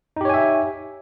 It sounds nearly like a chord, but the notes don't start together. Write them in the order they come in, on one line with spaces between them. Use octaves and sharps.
D#4 G4 C#5 G#5 E5